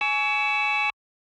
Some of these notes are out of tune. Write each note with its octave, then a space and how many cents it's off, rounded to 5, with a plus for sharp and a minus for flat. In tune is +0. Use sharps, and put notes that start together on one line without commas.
G#5 +20 C#6 +30 E6 +0